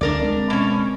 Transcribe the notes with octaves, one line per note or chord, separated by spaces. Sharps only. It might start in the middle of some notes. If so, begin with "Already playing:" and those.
D2 D4 A#4 D5
G#3 C4
B2 C#4